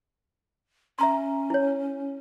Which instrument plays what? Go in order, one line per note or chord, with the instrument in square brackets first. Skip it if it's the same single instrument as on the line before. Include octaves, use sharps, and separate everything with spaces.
[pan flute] C#4 [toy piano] E5 A#5 C6
[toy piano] E4 C#5